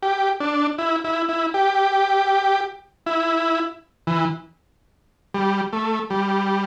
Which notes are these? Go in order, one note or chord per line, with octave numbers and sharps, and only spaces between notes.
G4
D4
E4
E4
E4
G4
E4
E3
G3
A3
G3